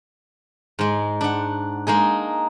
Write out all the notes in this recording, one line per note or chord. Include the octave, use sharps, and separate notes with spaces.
G#2 G#3
D4 F#5
G#3 A#3 D#4 G#4